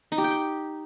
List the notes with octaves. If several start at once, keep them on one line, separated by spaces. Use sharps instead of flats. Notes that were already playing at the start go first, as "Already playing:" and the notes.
D#4
G4
G5